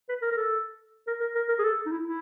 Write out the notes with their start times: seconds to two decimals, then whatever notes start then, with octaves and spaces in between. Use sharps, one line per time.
0.09 B4
0.22 A#4
0.32 A#4
0.37 A4
1.07 A#4
1.20 A#4
1.35 A#4
1.48 A#4
1.59 G#4
1.64 A4
1.86 D#4
1.92 E4
2.05 E4